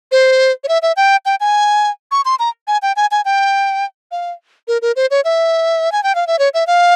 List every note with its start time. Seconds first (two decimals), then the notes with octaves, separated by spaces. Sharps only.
0.12 C5
0.64 C#5
0.68 E5
0.82 E5
0.97 G5
1.26 G5
1.40 G#5
2.11 C#6
2.25 C6
2.39 A#5
2.68 G#5
2.82 G5
2.96 G#5
3.11 G#5
3.25 G5
4.11 F5
4.68 A#4
4.82 A#4
4.96 C5
5.11 C#5
5.25 E5
5.92 G#5
6.03 G5
6.15 F5
6.27 E5
6.39 C#5
6.54 E5
6.67 F5